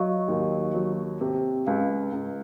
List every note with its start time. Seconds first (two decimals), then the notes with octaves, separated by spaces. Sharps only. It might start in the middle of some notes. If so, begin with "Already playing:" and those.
Already playing: F#3 D#5 F5 C#6
0.28 D#2
0.74 F#3
1.21 C3
1.67 C#2 F5
2.13 C#2